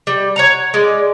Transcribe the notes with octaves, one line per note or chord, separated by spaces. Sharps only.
G3
C#5 F#5 A#5
G#3 D5